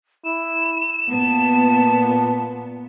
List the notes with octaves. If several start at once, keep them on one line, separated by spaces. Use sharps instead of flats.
E4 E7
A#2 B3 A5